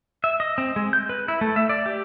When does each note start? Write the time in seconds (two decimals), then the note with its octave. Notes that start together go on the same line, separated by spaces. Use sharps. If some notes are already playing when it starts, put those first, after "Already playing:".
0.24 E5
0.40 D#5
0.58 C4
0.76 G#3
0.93 G6
1.09 B4
1.28 E4
1.41 A3
1.56 E5
1.69 D5
1.86 G4